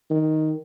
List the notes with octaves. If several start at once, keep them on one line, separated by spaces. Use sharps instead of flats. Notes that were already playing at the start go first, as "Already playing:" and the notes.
D#3